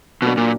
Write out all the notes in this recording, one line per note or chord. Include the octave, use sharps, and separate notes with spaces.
B2 F#3 A#3 D4
A#2